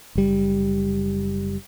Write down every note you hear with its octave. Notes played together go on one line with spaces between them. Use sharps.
F#1 G3